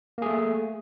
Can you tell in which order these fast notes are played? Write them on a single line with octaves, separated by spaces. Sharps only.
A#3 G#4 A3